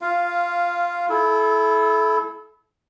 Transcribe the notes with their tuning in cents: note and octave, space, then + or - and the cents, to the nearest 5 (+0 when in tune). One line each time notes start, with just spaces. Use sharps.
F4 +0 F5 -10
E4 +0 A4 -35